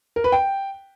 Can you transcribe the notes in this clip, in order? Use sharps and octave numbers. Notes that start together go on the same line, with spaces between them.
A#4
B4
G5